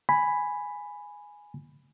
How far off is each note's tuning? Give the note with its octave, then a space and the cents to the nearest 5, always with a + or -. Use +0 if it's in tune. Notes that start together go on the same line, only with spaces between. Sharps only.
G#5 +0 B5 +5